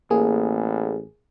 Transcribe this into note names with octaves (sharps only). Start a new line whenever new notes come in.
A1 A#3 G#4